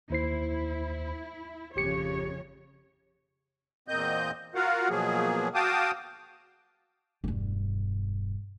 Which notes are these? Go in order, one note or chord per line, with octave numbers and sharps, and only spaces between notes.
D#2 E4 C5 C7
G#1 F2 C#3 G4 C#5 C#7
E2 A#2 A#3 C4 D#5 G6
F4 F#4 A#4 F5 F#5
B2 F3 F#3 A#3 G#4
F#4 F5 G5 A5 D6 D#6
E1 G2